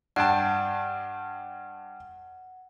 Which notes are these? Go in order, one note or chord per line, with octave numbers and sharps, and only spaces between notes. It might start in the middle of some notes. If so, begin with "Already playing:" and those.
G2 F#5 G5 A5